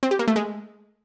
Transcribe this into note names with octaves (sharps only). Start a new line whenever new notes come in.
C4
G4
A#3
A3
G#3